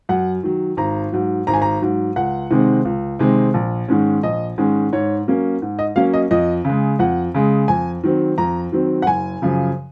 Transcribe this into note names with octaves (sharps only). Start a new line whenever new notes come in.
F#2 F#5
D#3 F#3
G#1 A#5
G#2 F#3
G#1 A#5
G#5
A#5
G#2 F#3
C#2 F#5
C3 D#3 G#3 C4
C#2
C3 D#3 G#3 C4
A#1
G#2 D#3 G#3 C#4
A#1 D#5
G#2 D#3 G#3 C#4
G#2 C#5
F#3 A#3 C#4
G#2
D#5
F#3 A#3 C#4 F5
D#5
F2 D#5
C#3 G#3
F2 F#5
C#3 G#3
F2 G#5
D#3 F#3 C4
F2 A#5
D#3 F#3 C4
F#5
F#1 G#5
F#2 C#3 F3